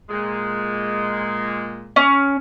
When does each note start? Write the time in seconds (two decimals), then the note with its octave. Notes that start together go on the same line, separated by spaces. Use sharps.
0.09 A#2 G#3
1.96 C#4